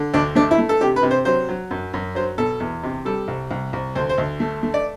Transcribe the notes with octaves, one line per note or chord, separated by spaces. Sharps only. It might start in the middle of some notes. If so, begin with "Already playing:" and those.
Already playing: D3
D2 D4
A3 D4
E4
A3
A4
C3 G4
B4
C3
C5
F#3 C5
F#3
F#2
F#2
F#3 C5
B2 A4
E2
C3
G3 A4
C2
C2
C2
D2 C5
C5
D2
A3
A3
D5